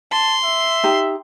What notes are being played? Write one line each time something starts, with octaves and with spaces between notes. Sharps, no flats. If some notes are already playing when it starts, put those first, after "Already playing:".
A5 C6
E5
D#4 G4